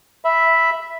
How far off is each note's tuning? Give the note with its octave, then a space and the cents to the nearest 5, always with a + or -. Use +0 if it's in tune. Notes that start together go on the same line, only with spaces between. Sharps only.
E5 +0 B5 +0